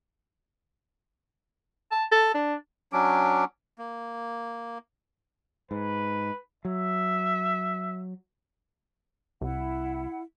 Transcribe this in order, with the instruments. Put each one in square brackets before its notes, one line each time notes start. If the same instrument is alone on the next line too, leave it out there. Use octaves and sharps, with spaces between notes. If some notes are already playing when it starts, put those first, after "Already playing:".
[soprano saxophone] A5
A4
D4
[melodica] F#3 C#4 D4 D6
A#3
[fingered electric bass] G#2 [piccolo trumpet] B4
[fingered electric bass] F#3 [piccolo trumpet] E5
[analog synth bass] C2 [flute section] E4 F#5